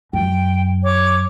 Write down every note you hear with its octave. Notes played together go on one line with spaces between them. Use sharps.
F#2 G5
C#5 D6